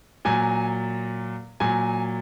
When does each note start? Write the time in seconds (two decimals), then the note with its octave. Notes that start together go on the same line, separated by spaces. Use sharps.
0.25 A#2 F#3 G#5
1.60 A#2 F#3 G#5